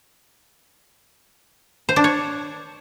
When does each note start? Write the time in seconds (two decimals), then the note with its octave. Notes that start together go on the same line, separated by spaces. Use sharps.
1.89 C5
1.96 D4
2.04 C#5